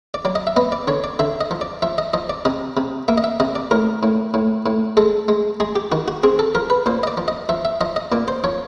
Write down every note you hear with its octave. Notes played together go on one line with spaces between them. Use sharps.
D5
F#3 D5
D#5
E5
B3 D#5
D5
D3 C#5
D5
D3 E5
D#5
F3
D5
F3 E5
D#5
F3 D#5
D5
C3 D#5
C3
A#3 E5
D#5
E5
C3 D#5
D5
A2 A#4
A2
A2
A2
G#3 A4
G#3
G#3 G#4
G4
D#3 F#4
F#4
C4 G#4
A4
F3 A#4
B4
A#2 C5
D#5
D5
F3
D#5
F3 E5
E5
F3 D#5
D#5
A#2 D5
C5
F3 C#5